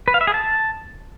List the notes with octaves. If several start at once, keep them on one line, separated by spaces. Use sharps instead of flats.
B4
F5
E5
G#4
A5